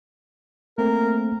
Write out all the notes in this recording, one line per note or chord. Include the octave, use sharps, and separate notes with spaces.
A3 A#3 C4 A#4